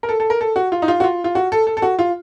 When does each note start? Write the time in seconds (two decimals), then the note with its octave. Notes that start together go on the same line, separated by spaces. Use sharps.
0.03 A#4
0.09 A4
0.20 A4
0.30 A#4
0.41 A4
0.56 F#4
0.72 F4
0.82 D#4
0.88 F4
1.00 F#4
1.04 F4
1.24 F4
1.35 F#4
1.52 A4
1.67 A4
1.77 A4
1.82 F#4
1.99 F4